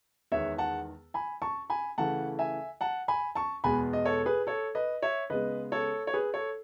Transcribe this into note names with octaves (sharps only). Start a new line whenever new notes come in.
E2 D#3 G#3 B3 C#5 E5
F#5 A5
G#5 B5
A5 C#6
G#5 B5
C#3 E3 A3 F#5 A5
E5 G#5
F#5 A5
G#5 B5
A5 C#6
E2 B2 G#3 B3 G#5 B5
D#5
A4 C#5
G#4 B4
A4 C#5
B4 D#5
C#5 E5
C#3 G#3 B3 B4 D#5
A4 C#5
C#5
G#4 B4
A4 C#5